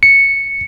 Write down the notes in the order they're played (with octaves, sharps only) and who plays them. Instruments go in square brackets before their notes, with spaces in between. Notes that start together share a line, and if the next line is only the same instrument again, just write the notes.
[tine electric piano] C#7